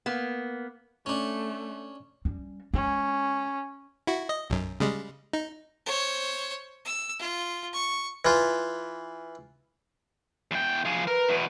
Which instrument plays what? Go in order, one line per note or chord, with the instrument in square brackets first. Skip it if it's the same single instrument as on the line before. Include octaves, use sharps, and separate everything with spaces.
[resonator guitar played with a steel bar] A#3 B3
[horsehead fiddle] A3 [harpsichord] C#4 D4
[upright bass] G3 C#4
[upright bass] G#3 [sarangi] C#4
[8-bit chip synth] E4 F#4
D#5
B1 F#2
C#3 G3 G#3
D#4
[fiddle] C5 C#5
E6
F4
C#6
[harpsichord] E3 F4
[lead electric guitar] E2 G5
F3 G#4
[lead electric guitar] A#4 [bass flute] B4
[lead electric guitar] E2 B2